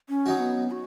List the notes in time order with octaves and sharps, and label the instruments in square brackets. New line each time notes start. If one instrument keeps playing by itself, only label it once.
[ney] C#4
[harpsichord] F#3 D#4 F#4
[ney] B3
F#4